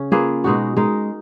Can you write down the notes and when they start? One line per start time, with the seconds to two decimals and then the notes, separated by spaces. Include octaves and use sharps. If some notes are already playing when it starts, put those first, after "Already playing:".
Already playing: C#3 C#4
0.12 A#3 F4 G#4 B4
0.44 B2 G#3 D#4 F#4
0.77 G#3 D#4 A#4